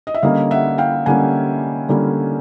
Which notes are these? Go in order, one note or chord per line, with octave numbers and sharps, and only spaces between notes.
D#5
E5
D3 G3 A#3 C#4 D#5 F5
E5 F#5
F5 G5
D3 G3 A#3 C#4 F#5 G#5
D3 G3 A#3 C#4